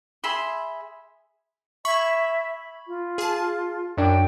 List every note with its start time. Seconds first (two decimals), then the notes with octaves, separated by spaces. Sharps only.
0.24 G#4 E5 B5 C6
1.85 E5 B5 C#6 G#6
2.87 F4
3.18 G#4 A5
3.97 F#2 F#3 D4 G5